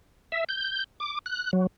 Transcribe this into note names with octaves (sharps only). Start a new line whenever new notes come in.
E5
G6
D6
F#6
F#3